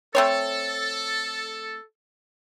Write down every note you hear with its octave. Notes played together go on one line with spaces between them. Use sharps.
A3 C4 A4 C#5